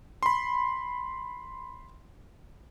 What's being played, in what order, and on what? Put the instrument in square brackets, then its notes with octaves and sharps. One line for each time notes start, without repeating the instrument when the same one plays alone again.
[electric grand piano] B5 C6